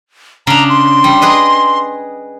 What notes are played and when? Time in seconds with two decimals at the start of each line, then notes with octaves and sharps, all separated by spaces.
0.47 C#3 D4 A#5
0.70 C6
1.04 G3
1.22 G#4 B4 D#5